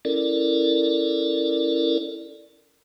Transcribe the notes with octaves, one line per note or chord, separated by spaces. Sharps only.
C#4 E4 A4 A#4 D5